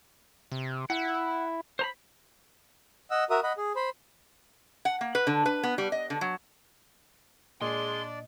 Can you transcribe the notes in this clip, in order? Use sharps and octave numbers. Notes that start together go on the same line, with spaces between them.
C3
E4 F#5
C5 A#5 B5
D#5 F#5 E6
F#4 A#4 E5 D#6
D#5 F#5 B5
G#4
C5 B5
F#5
A#3
B4
D3
B4
B3
G3
D#5
D3
F#3
A#2 G#3 D4 D5 D#5 C6